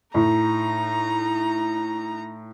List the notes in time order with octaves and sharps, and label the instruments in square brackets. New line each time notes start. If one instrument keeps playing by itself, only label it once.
[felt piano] A2 [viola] D#4 A#5